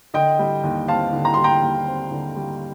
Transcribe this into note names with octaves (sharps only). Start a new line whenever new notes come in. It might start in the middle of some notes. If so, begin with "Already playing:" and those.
D3 D#5 G5
G3
D#2
C4 F5 A5
D3
A#5
G3 C6
G5 A#5
D#2
C4
D3
G3